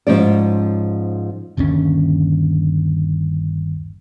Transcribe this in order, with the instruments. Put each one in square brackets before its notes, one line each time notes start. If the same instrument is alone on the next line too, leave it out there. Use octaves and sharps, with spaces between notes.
[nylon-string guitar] G#2 F3 C#4 D5
[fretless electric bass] G1 D#2 D3 C#4